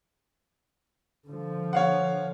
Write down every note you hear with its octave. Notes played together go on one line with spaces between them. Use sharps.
D3 F3
C#5 F5 F#5